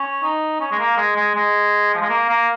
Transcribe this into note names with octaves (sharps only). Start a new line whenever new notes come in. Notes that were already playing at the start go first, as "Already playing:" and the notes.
Already playing: C#4
D#4
C#4
G#3
A#3
G#3
G#3
G#3
F3
G#3
A#3
A#3